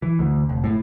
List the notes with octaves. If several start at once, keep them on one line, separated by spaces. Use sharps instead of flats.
E3
D2
F1
A2